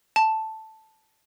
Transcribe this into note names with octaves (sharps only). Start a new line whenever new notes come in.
A5